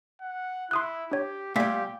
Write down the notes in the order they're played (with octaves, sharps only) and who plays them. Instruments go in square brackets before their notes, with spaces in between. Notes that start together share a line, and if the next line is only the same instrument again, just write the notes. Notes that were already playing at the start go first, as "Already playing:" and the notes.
[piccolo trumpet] F#5
[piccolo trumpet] E4 [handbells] C6 D#6 F#6
[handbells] D4 C#5 [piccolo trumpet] G4
[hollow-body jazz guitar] A#2 G3 [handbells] A3 B6 [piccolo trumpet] G4